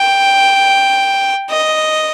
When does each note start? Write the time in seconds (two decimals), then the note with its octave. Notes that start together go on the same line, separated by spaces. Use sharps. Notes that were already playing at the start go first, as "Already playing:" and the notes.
Already playing: G5
1.50 D#5